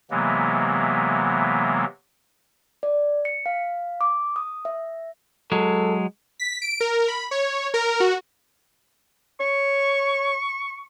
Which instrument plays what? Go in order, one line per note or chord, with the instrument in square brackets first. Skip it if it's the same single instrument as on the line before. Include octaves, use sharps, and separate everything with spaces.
[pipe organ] C3 E3 F#3 G#3 A#3 B3
[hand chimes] D5
C#7
F5
D6
D#6
E5
[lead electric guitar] F#3 G#3 [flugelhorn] A4
[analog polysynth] B6
D7
A#4
B5
C#5
A#4
F#4
[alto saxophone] C#5 [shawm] C#6